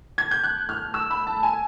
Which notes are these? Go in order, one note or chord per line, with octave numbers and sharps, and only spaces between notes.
G#6
G6
F#6
F6
E6
B5
A5
G#5